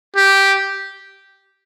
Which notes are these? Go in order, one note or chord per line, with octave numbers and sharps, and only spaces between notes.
G4